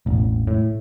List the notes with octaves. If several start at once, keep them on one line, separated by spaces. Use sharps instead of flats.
E1 A1
A2